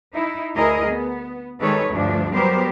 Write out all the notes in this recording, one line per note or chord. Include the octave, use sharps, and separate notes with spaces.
D#4 E4
D2 E4 G#4 A#4 D#5
B3
D#3 G3 G#3 A4 B4 C#5
D2 G2 F3 D4
F#3 G3 B3 G4 A#4 C5